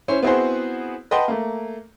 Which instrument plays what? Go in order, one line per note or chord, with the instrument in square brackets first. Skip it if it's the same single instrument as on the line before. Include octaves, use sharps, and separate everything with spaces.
[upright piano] C#4 E4 C5
B3 C4 E4 F#4 G#4 C5
B4 D#5 F#5 G5 A5 C6
A3 A#3